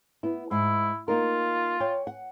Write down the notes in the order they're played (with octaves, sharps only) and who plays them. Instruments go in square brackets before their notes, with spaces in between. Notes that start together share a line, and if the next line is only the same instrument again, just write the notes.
[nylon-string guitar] B3 E4
[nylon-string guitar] G#2 [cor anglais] E4
[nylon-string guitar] A#3 D#4 A#4 [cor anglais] F4
[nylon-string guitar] C#5 G5
F#5